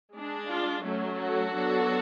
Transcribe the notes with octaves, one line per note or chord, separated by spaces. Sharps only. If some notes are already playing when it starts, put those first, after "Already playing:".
G#3 D4
F4
F#3 A3 C#4
F#4 A4
F#3 B3 D4